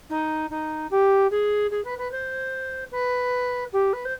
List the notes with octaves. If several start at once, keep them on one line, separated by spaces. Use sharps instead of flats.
D#4
D#4
G4
G#4
G#4
B4
B4
C5
B4
G4
B4
C5